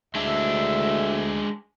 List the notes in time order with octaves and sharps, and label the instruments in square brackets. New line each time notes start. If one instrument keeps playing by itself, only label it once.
[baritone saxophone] D2 [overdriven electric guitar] G#3 D4 [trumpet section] E5